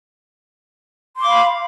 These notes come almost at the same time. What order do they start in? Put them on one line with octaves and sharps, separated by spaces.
C6 D6 F5 B5